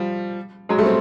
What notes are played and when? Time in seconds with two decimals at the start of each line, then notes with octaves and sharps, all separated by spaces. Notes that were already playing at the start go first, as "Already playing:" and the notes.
Already playing: F3 G3
0.69 F#3 G#3
0.78 G3 A3
0.85 C4